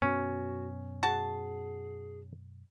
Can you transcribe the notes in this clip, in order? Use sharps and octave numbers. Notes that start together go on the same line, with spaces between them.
F#2 B2 B3 C#4 F#4
F#4 G#4 A5